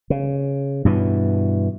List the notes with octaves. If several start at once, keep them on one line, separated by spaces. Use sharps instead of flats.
C#3
G2 B2 E3